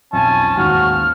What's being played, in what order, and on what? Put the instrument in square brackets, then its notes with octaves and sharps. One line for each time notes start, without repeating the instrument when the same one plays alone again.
[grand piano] B1 F2 [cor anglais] C#4 [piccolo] G#5 [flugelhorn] A5
[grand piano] A1 D#2 G#2 [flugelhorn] F#4 [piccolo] F6